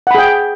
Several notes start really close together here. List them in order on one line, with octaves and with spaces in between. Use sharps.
F#5 B5 G#4 G5